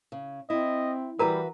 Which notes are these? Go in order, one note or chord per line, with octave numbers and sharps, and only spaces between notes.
C#3
C4 E4 D#5
E3 G3 E4 F#4 A#4 B4 A#5